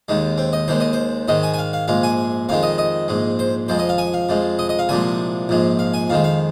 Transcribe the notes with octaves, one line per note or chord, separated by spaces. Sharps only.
D#2 D#3 G#3
C4
D#5
D#2 D#3 G#3 C5
D#5
C5
G#2 D#3 G#3 D#5
G#5
G#5
F5
F5
A#1 G#2 G#3 F5
G#5
F2 D#3 G#3 F5
D#5
D#5
A#1 G#2 G#3
C5
F2 F3 G#3 C5
D#5
F5
G#5
F5
F2 F3 G#3
D#5
D#5
F5
C2 A#2 F3 G#3 G#5
A#1 G#2 F3 G#3
F5
G#5
F2 D#3 G#3 F5
F5